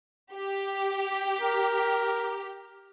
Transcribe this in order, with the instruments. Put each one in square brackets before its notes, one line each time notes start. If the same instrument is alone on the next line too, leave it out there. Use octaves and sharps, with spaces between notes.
[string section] G4
[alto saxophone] A#4